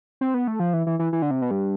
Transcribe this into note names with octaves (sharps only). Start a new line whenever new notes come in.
C4
B3
A3
F3
E3
E3
E3
E3
D3
C3
B2
G2